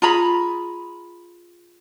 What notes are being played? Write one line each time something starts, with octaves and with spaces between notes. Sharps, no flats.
F4 G#4 A#5 B5